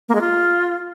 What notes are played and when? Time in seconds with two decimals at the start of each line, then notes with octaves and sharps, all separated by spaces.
0.09 A#3
0.15 G#3
0.21 F4